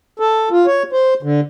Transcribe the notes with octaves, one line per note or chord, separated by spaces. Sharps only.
A4
F4
C#5
C5
D3